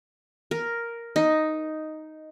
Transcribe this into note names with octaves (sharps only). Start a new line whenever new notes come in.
A#4
D#4